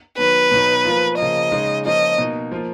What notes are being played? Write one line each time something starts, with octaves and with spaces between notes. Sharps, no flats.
D#3 F#3 B3 B4
B2 F#3 B3 D#4
F3 A#3 F4
C#3 F3 A#3 D#5
C#3 G#3 D#4
F3 A#3 C#4 F4 D#5
B2 A#3 D#4
F3 A#3 F4